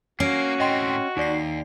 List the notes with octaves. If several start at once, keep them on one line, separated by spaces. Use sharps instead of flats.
A#3 C#4 F#4 C7
A2 C4 D#5 G5 C6
D#2 D#4 D5 C7